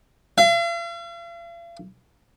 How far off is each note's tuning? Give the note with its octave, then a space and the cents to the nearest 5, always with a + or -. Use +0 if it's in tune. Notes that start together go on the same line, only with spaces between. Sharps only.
F5 -45